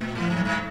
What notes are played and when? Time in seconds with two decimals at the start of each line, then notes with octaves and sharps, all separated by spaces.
0.01 A#2 A3
0.15 A2
0.20 F3
0.30 G#2
0.36 F#3
0.40 G#2 G3